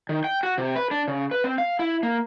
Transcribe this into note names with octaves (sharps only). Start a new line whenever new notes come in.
D#3
G5
F#4
C3
B4
D4
C#3
B4
C4
F5
E4
A#3